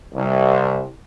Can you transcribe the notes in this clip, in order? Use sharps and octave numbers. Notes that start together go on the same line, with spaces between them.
C2